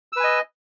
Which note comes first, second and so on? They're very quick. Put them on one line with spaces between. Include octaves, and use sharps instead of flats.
E6 B4 G#5 D#5